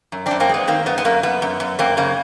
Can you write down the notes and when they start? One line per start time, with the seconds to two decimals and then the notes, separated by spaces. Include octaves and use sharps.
0.12 F#2
0.26 C4 D4
0.31 F#2
0.40 A#3 C4
0.49 G#3 B3
0.67 D#3 A#3 C4
0.86 F#2 B3
0.98 B3
1.05 F#2 A#3
1.23 F#2 B3
1.42 F#2
1.60 F#2
1.79 F#2 A#3 C4
1.97 C#3 A#3